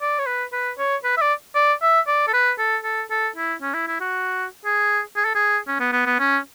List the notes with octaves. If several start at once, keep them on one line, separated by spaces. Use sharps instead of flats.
D5
C#5
B4
B4
C#5
B4
E5
D5
D5
E5
D5
A4
B4
A4
A4
A4
E4
C#4
E4
E4
F#4
G#4
G#4
A4
G#4
C#4
B3
B3
B3
C#4